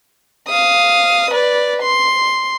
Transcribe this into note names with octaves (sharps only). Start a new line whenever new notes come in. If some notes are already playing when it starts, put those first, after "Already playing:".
F5 D#6
B4 D5
C6